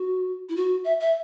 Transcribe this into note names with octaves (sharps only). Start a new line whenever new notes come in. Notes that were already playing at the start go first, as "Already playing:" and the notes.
Already playing: F#4
E4
F#4
E5
E5